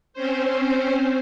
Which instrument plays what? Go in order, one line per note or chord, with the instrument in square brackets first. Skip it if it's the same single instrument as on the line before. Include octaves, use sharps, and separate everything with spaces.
[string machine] C4 C#4 C5